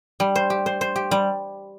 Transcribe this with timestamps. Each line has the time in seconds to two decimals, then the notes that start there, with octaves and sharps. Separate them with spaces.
0.20 G3
0.36 C5
0.50 G4
0.66 C5
0.81 C5
0.96 G4
1.11 G3